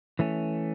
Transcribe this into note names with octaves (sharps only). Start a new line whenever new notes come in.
E3 A3 C#4